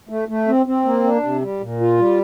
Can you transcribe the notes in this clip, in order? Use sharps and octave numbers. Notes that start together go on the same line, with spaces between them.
A3
A3
C4
C4
A#3
D4
C3
G3
A#2
F4
G3